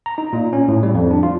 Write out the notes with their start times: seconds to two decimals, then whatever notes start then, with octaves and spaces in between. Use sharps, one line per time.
0.06 A#5
0.18 D#4
0.33 A#2
0.53 C#4
0.68 A2
0.83 G3
0.95 F2
1.11 D4
1.23 F4